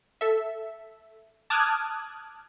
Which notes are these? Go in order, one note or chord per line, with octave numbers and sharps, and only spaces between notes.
A4 E5
A5 D6 D#6 F6 F#6 G#6